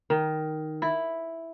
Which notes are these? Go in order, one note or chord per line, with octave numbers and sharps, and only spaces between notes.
D#3
E4